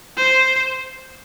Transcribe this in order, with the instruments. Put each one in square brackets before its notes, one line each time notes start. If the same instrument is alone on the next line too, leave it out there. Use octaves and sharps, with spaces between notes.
[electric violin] C5